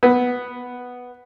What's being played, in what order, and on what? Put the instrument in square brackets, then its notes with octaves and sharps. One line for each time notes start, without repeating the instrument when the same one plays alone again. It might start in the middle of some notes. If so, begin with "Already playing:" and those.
[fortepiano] B3